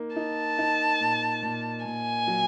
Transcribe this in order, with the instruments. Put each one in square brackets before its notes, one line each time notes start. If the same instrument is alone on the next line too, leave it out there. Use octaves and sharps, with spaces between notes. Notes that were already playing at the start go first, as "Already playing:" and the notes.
Already playing: [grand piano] A#3 D#4
[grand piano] D#4 [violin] A5
[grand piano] D#4
A#2
A#2
[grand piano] A#2 [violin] G#5
[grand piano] F#3